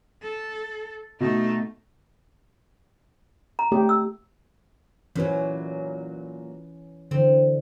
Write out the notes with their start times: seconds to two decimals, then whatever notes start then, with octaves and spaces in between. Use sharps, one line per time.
0.22 A4
1.20 B2 A3 D#4
3.59 A#5
3.72 A3 G4
3.89 E6
5.16 A#2 E3 F#3 C#4 B4
7.11 D3 E3 C4